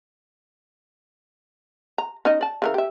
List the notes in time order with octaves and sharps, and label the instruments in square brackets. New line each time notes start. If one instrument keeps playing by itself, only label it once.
[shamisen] A#5
C#4 D#4 D#5
D5 A5
C#3 E3 A#4
G4 E5